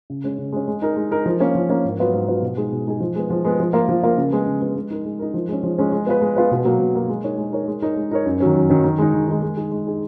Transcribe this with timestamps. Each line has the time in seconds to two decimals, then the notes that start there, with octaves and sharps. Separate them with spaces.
0.10 C#3
0.24 G#3 C#4
0.38 C#3
0.53 G#3 C#4
0.68 G#3
0.82 D#4 A#4
0.96 G#3
1.11 D#4 A#4
1.26 F3
1.40 A#3 C#4
1.55 F3
1.70 A#3 C#4
1.84 G#2
1.99 F#3 B3 F4 B4
2.13 G#2
2.28 F#3 B3 F4 B4
2.42 B2
2.57 G#3 D#4 G#4
2.72 B2
2.87 G#3 D#4 G#4
3.00 F3
3.15 G#3 B3
3.30 F3
3.45 G#3 B3
3.60 F3
3.73 A#3 F4 A#4
3.89 F3
4.03 A#3 F4 A#4
4.18 C#3
4.32 G#3 B3
4.46 C#3
4.62 G#3 B3
4.76 G#3
4.91 D#4 A#4
5.05 G#3
5.19 D#4 A#4
5.34 F3
5.48 G#3 C#4
5.63 F3
5.78 G#3 C#4
5.92 G#3
6.07 B3 F4 B4
6.22 G#3
6.36 B3 F4 B4
6.51 B2
6.65 F#3 A#3
6.80 B2
6.95 F#3 A#3
7.09 G#3
7.24 D#4 A#4 C#5
7.38 G#3
7.52 D#4 A#4 C#5
7.68 G#3
7.82 D#4 A#4 C#5
7.96 G#3
8.11 D#4 A#4 C#5
8.26 F#2
8.40 D#3 F#3 C#4
8.55 F#2
8.70 D#3 F#3 C#4
8.84 D#3
8.98 G#3 D#4
9.14 D#3
9.28 G#3 D#4
9.42 G#3
9.57 D#4 G#4
9.72 G#3
9.87 D#4 G#4